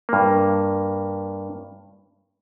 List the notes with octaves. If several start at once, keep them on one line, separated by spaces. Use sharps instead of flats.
G2 A#3